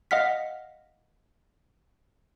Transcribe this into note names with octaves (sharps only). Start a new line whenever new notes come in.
D#5 F5 F#5 F6 B6